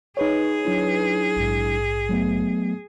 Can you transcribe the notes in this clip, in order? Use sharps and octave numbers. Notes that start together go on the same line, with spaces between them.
D#4 G#4 B4 C#5
F#3 D4 E4
A#1 G#2
F#3 A3 B3